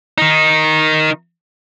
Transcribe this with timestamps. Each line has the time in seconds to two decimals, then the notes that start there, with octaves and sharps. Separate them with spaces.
0.18 D#3 D#4